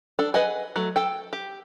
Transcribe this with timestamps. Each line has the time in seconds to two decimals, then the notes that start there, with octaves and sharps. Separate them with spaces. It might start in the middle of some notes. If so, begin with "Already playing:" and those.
0.19 D4 A4
0.34 G#4 B4 D#5 F#5 G#5
0.76 F#3 A3
0.96 A4 G5
1.33 G4